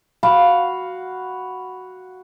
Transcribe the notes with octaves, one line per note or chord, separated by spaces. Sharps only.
F#4 F5 B5